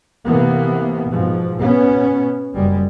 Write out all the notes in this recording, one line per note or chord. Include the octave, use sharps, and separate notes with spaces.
C3 E3 A#3 B3
G#2 B2 F3
B2 B3 C#4
F#1 G3 G#3